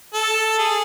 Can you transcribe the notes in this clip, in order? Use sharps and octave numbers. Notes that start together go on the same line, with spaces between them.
A4
G#4